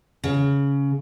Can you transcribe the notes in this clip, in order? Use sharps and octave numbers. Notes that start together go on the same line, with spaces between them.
C#3